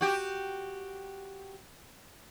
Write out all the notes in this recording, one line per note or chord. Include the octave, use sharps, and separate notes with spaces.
F#4 G4